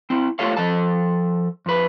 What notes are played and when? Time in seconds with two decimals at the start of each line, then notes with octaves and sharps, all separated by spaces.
0.10 C4 E4
0.39 A3 F4 G4 A4 C#5 F5
0.57 F3 A4 A5
1.66 F2 B4